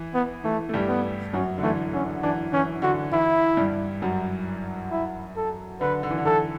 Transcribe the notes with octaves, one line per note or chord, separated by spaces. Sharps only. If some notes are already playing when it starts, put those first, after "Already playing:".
Already playing: E3
B3
E3 A3
A3
G2 G3
B3
F#2 F#3 C#4
D3
E3 A3
D3 C#4
E3 D4
E3 C#4
D3 F#4
E3 E4
G2 G3
F#2 F#3
E4
A4
D3 B4
D3
E3
D3
E3 A4